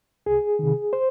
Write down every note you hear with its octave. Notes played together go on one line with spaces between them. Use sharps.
C2 G#4
C3 D#3
C5